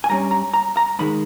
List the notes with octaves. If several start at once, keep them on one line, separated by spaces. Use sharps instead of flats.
G#5
G2 G3 C#4 A#5
A#5
A#5
A#5
G#2 D#3 G#3 B5